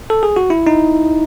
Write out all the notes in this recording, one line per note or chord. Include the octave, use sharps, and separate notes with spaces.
A4
G#4
F#4
E4
D#4